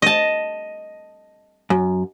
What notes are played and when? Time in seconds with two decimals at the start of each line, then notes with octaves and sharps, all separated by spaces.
0.02 D#5 A5
1.70 F#2